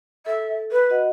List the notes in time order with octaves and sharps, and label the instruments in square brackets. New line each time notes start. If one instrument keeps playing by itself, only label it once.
[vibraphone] A4 [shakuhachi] E5
[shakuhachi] B4
[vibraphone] F#4 D#5 F#5